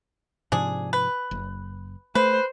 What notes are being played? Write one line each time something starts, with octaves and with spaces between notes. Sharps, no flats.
G#2 C3 F3 D4 G#4
B4
F#1
A3 B4 C5